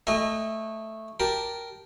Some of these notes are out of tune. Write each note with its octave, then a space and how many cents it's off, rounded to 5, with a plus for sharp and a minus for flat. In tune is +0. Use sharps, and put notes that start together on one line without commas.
A3 +0 D#5 +0 G#5 -40
G4 +0 A#4 +5 A5 +0